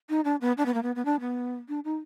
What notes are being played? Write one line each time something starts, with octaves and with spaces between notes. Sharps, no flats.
D#4
D4
B3
D4
B3
A#3
B3
B3
D4
B3
D4
D#4